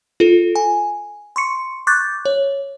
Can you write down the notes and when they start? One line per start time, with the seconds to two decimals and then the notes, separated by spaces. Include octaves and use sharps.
0.20 F4 A4
0.56 G#5
1.36 C6 C#6 C#7
1.87 C#6 D6 F#6 G6 A6
2.25 C#5